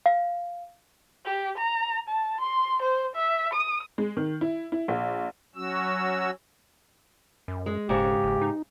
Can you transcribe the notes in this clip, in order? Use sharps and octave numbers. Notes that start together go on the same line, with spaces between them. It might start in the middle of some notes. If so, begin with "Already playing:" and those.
F5
G4
A#5
A5
C6
C5
E5
D#6
G#3
D#3
E4
E4
A#1
F#3 C#4 F#4 E6
F#2
G#3
E1 G#2 C#3 G4
F#1
D#4